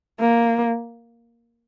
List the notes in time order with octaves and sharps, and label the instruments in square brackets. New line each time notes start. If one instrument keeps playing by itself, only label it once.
[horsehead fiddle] A#3